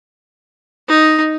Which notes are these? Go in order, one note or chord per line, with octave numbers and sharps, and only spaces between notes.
D#4